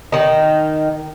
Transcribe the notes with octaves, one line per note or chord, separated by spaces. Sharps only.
D#3 D#4